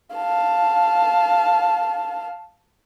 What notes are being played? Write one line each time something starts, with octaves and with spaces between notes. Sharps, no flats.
F5 A5